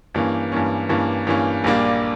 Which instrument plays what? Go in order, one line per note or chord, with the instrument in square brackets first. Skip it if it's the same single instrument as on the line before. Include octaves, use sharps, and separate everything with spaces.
[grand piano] G2 E3 A#3 C#4
G2 E3 A#3 C#4
G2 E3 A#3 C#4
G2 E3 A#3 C#4
A#1 A#2 G3 A#3 D4